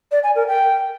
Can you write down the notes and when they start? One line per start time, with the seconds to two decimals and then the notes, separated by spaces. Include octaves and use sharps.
0.12 D5
0.24 G#5
0.36 A#4
0.47 G5